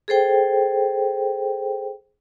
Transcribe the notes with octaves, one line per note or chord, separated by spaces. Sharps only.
G#4 A4 C5 G5